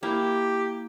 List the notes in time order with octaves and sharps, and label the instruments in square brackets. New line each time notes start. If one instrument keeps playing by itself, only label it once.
[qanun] A#3 E4 [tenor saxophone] G4